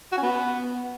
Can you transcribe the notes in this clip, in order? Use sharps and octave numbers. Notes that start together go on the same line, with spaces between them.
F#4
C#4
B3